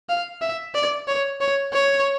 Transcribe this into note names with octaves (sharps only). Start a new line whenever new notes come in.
F5
E5
D5
C#5
C#5
C#5